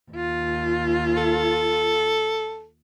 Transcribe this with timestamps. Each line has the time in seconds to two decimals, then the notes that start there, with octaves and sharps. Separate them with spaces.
0.12 D#2 F4
1.17 A4